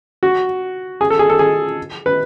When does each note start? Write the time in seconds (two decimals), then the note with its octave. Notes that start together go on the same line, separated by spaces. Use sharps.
0.23 F#4
1.01 G#4
1.10 A4
1.19 G#4
1.30 A4
1.39 G#4
2.06 B4